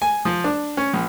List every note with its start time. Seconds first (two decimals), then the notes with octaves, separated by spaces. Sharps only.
0.02 G#5
0.25 F3
0.44 D4
0.77 C#4
0.93 A#1